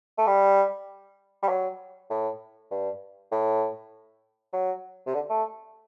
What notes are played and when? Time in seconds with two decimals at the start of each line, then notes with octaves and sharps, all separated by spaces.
0.18 A3
0.27 G3
1.43 G3
1.49 F#3
2.10 A2
2.71 G2
3.31 A2
4.53 F#3
5.07 C3
5.14 D3
5.30 A3